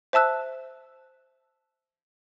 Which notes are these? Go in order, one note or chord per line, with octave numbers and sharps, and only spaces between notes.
C5 E5 A5 E6 F#6